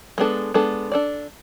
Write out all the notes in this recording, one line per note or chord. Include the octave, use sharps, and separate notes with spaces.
G#3 B3 D4 A4
G#3 B3 D4 A4
D4 A4 D5